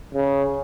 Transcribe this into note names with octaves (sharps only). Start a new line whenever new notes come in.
C#3